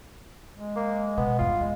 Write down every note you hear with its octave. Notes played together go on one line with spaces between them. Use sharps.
G#3
A#3
B2 B3
G1 E2 F4
A#1 E2 G#3